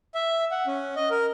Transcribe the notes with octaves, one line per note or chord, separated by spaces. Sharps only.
E5
F#5
C#4
D#5
A#4